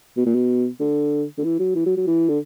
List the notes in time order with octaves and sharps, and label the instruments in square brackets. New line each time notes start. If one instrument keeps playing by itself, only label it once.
[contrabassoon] B2
A#2
B2
D3
D3
E3
F#3
E3
F#3
F#3
E3
D3